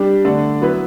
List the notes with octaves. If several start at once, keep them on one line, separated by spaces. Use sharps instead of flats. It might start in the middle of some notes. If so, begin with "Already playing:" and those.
Already playing: G3 D4 G4
D3 A3 D4 A4
F#3 B3 E4 B4